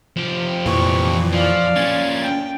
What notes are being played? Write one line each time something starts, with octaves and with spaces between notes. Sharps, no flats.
F3 G4
F2 A#2 E3 C#6
F3 D5 F5
A#2 C#4 G#6 A6
G5